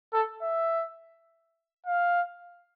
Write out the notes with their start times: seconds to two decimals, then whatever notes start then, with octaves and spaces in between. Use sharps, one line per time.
0.13 A4
0.42 E5
1.87 F5